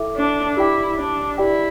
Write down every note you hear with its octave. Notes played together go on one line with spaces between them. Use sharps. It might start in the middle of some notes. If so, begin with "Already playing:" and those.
Already playing: E4 A4 E5 G5 D6
D4
E4 G4 D5 G5 D6
D4
E4 G4 D5 G5